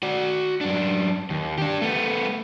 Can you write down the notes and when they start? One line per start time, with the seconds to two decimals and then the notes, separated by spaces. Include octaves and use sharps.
0.03 F#4 D5
0.61 F#2 D4
1.30 D#2
1.58 D4 G4
1.82 A3 B3